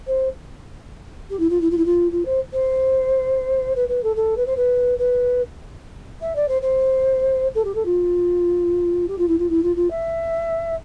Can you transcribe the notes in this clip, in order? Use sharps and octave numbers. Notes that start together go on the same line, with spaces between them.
C5
G4
E4
F4
E4
F4
E4
F4
F4
C5
C5
B4
B4
A4
A4
B4
C5
B4
B4
E5
D5
C5
C5
A4
G4
A4
F4
G4
F4
E4
F4
E4
F4
F4
E5